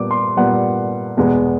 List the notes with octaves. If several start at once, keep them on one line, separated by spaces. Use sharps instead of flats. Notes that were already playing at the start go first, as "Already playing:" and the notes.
Already playing: A#2 G3 B3 D6
C6
A#2 G3 B3 F#5
E2 B2 G#3 B3